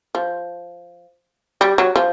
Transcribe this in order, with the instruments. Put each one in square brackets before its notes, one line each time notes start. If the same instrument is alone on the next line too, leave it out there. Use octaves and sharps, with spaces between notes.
[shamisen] F3
G3
F#3
F3